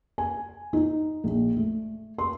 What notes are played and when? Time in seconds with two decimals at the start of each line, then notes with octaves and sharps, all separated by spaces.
0.18 G#5
0.73 D#4
1.24 A#1
1.57 A3
2.18 C6